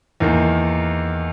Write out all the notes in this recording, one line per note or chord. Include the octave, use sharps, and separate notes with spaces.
E2 D#3 A#3